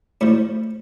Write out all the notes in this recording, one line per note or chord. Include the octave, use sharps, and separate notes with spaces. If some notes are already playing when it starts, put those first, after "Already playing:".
A2 F3 A3